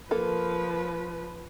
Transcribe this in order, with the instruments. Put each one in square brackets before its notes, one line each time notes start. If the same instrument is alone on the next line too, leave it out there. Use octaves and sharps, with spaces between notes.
[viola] F3 B4 [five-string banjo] A#3 A4